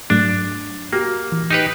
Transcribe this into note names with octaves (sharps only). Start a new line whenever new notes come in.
G#2 F#3 A3 D4
A#3 F#4 G4
E3
D#4 G4 B4